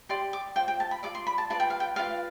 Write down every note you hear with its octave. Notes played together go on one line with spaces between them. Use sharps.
G4 D5 C6
D6
F4 C5 G5
G5
A5
B5
F4 A4 D5 D6
C6
B5
A5
F4 B4 D5 A5
G5
F5
G5
F4 B4 D5 F5